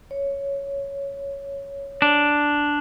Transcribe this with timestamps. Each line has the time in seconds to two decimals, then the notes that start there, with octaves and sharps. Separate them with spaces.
0.11 C#5
2.02 D4